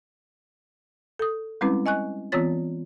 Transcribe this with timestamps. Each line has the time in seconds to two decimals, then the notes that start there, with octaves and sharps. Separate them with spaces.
1.19 A4 D#6
1.61 G3 G#3 C4 C#4 E4 B4
1.86 D#5 G#5 C#6 F#6
2.32 E3 B3 C4 F4 C#5 A6